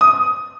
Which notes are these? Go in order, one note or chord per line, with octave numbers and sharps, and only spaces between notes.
D#6